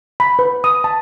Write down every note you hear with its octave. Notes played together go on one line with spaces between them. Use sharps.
B5
B4
D#6
A5